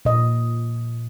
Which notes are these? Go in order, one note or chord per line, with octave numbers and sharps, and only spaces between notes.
A#2 D#5